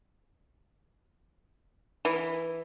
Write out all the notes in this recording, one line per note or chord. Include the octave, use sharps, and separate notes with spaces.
E3